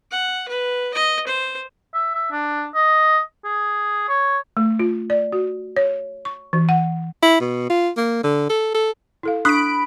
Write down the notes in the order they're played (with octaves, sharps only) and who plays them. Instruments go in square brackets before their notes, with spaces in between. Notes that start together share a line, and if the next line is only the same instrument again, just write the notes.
[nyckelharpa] F#5
B4
D#5
C5
[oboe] E5
E5
D4
D#5
G#4
C#5
[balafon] A3
F4
D5
F#4
C#5
C#6
E3
F#5
[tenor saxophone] E4
B2
F4
A#3
D3
A4
A4
[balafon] E4 A4 F5
[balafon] D4 C#6 [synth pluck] B5 D7 [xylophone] D#6 F#6